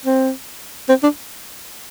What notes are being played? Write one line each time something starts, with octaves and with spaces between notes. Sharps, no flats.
C4
C4
D4